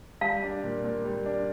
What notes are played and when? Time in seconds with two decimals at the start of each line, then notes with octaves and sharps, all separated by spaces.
0.21 G3 F5 A5
0.43 D4
0.64 A#2
0.84 A#2
1.05 G3
1.26 D4